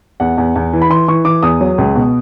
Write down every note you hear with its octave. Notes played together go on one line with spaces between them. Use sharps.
E2 F#5
E2
E2
E3
B5
E3 C6
E3 C#6
E3 D6
E2 D#6
F#3
C#2
B2